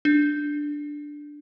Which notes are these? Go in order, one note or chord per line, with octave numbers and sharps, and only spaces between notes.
D4